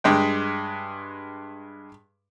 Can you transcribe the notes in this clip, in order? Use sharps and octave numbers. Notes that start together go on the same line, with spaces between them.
G2 G#3 G5